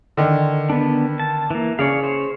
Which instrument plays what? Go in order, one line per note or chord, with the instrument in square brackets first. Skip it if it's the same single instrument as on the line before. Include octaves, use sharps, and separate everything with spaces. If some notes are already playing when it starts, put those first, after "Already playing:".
[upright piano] D3 D#3
[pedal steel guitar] B3 D4
A5
E3 A#3
[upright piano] C#3 [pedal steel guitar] C#5 D5 F5
[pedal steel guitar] C5 C#5